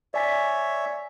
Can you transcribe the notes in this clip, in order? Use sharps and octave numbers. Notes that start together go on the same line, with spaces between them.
C#5 D5 E5 G#5 B6